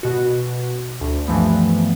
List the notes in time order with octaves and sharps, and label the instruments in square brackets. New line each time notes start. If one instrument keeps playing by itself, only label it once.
[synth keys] B2 F#4
D2
G2 E3 F3 A3 B3